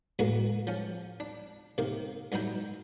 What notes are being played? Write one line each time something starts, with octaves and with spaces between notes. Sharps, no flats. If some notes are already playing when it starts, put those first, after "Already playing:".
A2 E3 G#3 A#3 B3 F#4
F3 C#4
D4
C3 D#3 A#3
G2 F#3 D#4 E4 G5